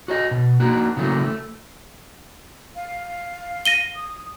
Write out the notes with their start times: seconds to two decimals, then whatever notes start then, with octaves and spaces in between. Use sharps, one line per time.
0.08 F#4 C#5 D#5
0.31 B2
0.60 A#3 D#4 F#4
0.97 C#3 E3 F#3 A3 A#3
1.22 A3
2.76 F5
3.65 A#6 D#7 G7
3.95 D#6